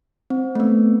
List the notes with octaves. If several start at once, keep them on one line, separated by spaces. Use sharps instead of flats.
C4
A3
B3